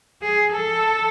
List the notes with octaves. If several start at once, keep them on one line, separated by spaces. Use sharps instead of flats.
G#4
A4